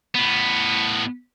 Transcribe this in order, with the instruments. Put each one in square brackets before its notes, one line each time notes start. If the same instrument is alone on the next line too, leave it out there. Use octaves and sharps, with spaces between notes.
[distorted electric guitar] A2 B3